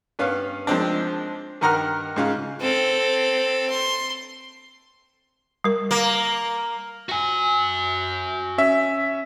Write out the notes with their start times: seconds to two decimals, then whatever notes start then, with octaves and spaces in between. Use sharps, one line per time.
0.19 G2 B3 C#4 F5
0.67 F3 G#3 C4 D4
1.61 G2 D#3 A#4 F#5 A#5 F6
2.16 G#2 C#3 F4
2.60 C4 A4
3.69 C6
5.64 G3 A#4
5.91 A#3
7.09 F#4 G#5
8.58 C#4 E5